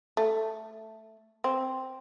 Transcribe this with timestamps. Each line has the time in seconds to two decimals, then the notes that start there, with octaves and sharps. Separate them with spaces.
0.17 A3
1.44 C4